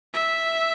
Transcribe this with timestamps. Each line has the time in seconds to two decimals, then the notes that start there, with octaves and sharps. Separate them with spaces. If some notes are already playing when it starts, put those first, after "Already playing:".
0.14 E5